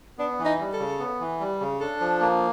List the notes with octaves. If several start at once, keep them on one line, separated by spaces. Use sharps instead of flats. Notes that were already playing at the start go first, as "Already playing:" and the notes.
B3 D4
E3
D#4
G3
A4
C#3
B3
E3
G3
C#3
D4 A4
F3
A#3